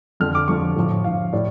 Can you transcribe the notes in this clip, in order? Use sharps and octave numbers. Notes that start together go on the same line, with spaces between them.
F2 D3 F3 F6
D6
F2 D3 F3 C#6
A2 F3
A2 F3 F5
A2 D5